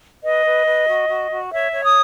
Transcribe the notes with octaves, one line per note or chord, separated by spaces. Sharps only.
B4 D#5
B4
B4
F#4
F#4
F#4
C#5 E5
C#5
D#6